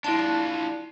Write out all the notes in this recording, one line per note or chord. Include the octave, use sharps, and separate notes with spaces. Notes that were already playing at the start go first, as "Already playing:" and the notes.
D4 E4 F4 A5